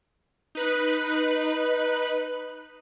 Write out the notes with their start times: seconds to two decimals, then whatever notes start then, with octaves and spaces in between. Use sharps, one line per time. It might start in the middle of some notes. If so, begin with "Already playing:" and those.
0.55 D#4 B4 F#6